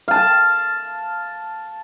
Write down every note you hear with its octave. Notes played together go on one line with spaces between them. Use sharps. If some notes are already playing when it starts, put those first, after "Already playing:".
F5 A5